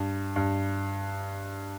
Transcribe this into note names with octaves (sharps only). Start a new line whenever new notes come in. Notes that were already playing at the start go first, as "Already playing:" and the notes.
Already playing: G2
G2